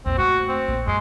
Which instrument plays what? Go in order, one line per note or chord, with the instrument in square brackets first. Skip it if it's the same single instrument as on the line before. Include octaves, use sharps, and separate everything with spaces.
[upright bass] A#1 E2 [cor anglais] C4
[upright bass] A3 [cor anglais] F#4
[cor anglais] C4
[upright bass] A#1
[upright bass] F#2 [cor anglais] G#3